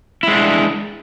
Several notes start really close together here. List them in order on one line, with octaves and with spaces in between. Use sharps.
E4 G#3 D4